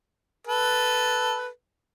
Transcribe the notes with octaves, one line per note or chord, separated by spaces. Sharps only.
A4 B4